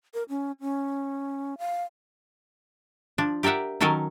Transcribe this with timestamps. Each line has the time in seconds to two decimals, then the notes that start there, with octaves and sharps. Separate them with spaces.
0.14 A#4
0.29 C#4
0.61 C#4
1.59 F5
3.18 F3 D4
3.43 G4 A#4 D5 E5 F#5
3.80 D#3 F#3 C#4 A4 A#4 D#5